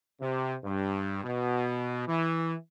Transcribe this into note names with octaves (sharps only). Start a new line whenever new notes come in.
C3
G2
B2
E3